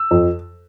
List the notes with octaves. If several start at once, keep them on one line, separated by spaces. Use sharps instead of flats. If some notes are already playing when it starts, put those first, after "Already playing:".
Already playing: E6
F2